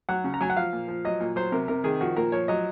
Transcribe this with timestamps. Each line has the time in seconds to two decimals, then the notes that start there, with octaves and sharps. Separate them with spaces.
0.09 F#3 F#5
0.24 C#3
0.34 A#5
0.41 F#3 G#5
0.50 F#5
0.57 F3 F5
0.73 A#2
0.88 F3
1.05 F#3 D#5
1.20 A#2
1.36 F#3 C5
1.52 C3 A#4
1.68 C3 A#4
1.84 D#3 G#4
2.01 F3 F#4
2.17 A#2 A#4
2.32 F3 C#5
2.48 F#3 D#5